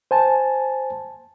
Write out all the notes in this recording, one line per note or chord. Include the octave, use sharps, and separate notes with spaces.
C5 G#5 A5